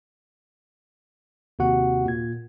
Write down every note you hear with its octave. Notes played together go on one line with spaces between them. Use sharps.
D#2 C3 F#4 F#5
A#2 G#6